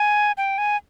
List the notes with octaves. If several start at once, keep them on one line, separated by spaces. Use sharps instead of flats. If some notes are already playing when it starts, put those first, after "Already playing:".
Already playing: G#5
G5
G#5